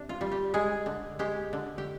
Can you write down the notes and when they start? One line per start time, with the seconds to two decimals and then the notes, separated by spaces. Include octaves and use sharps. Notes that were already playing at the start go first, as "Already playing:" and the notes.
Already playing: C3 D4
0.09 F4
0.21 G3
0.32 G4
0.54 G#3 G#4
0.86 D3
1.19 G#3 G4
1.53 D3
1.78 G4